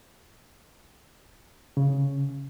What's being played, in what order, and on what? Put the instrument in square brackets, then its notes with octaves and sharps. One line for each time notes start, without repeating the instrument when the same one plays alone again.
[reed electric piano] C#3